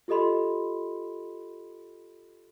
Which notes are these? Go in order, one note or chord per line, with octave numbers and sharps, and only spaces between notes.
F4 G4 A4 D#5 B5 C6